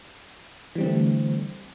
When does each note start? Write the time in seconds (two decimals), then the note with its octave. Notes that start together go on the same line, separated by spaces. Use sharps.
0.75 E3
0.78 G3
0.81 C4
0.83 D3
0.86 A3